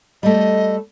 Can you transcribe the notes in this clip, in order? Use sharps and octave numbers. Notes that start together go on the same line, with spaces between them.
G3 A3 D#5